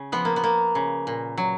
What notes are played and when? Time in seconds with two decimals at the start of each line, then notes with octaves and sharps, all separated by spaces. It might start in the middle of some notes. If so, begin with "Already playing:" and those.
Already playing: C#3
0.12 F3 B3
0.25 A#3
0.36 B3
0.44 A#3
0.75 C#3
1.07 A#2
1.37 F#3